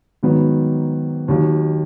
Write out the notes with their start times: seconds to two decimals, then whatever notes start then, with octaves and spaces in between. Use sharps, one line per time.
0.23 G#2 D#3 F#3 B3
1.28 D#2 D#3 F#3